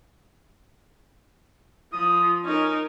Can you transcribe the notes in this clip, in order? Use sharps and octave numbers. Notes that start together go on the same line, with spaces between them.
F3 D#6
C#4 D#4 A#4